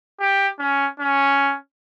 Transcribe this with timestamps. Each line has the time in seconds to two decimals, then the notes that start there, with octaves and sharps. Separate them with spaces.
0.20 G4
0.59 C#4
1.00 C#4